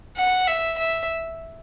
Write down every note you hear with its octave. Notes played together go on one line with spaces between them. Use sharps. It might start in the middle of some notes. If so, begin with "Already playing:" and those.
F#5
E5
E5